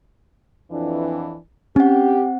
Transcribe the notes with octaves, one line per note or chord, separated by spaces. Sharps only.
F2 E3 D4
C4 C#4 G4 F#5